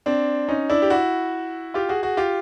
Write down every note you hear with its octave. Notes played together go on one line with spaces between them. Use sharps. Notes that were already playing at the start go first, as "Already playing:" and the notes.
C4 D4
C#4 D#4
D4 E4
G4
E4 F#4
F4 G4
F#4 G#4
F#4 G#4
F4 G4